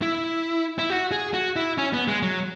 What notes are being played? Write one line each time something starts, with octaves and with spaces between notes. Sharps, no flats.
E4
E4
F#4
G#4
F#4
E4
C#4
B3
G#3
F#3